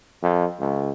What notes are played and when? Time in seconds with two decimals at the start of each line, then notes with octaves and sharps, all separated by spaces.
0.22 F2
0.60 C#2